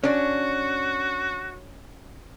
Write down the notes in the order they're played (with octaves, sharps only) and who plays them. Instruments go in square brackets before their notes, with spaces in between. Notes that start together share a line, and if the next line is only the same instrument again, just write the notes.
[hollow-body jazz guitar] C#4 D4 [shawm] F#4